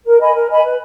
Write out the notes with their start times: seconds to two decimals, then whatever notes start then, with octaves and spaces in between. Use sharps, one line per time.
0.05 A#4
0.20 D#5 G#5 B5
0.35 A#4
0.50 D#5 G#5 B5
0.63 B4